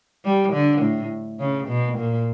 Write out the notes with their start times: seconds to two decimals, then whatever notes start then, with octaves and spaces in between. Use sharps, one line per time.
0.25 G3
0.53 D3
0.82 A2
1.40 C#3
1.68 B2
1.98 A#2